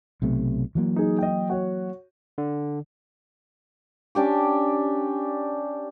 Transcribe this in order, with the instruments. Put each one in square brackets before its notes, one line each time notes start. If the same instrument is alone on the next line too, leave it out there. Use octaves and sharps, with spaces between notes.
[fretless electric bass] B1 C3 A3
E3 F#3 A#3
[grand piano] D#4 G#4
D#5 G5
F#4 C#5
[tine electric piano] D3
[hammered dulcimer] C#4 D4 G4 D6